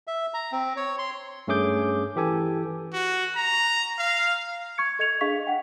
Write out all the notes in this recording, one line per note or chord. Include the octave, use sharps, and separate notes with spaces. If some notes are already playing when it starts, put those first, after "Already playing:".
E5
A#5
C4
C#5
C6
G2 A3 C#4 G#4 D6 G6
E3 G4 A4 G#5
F#4
A#5
F5
C#6 G#6 C#7
A4 D#5 G#6 C#7 F7
D4 G#4 D#5 F5 C#6 B6
F#5 G5